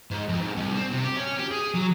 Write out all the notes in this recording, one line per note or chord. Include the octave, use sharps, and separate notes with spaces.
G#2
F2
G#2
C2
C4
C3
G4
C#4
G4
G#4
F#3